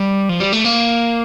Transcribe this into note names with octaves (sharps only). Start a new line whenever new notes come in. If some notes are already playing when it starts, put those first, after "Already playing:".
Already playing: G3
F3
G3
A3
A#3